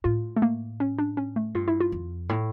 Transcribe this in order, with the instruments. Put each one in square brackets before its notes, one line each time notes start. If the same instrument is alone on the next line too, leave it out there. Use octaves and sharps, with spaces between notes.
[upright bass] A2 [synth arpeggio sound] F4
[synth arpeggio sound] A3
A#3
C#4
D4
C#4
A3
[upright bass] G2 [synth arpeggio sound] F4
[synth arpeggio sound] E4
F4
[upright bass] F2
A2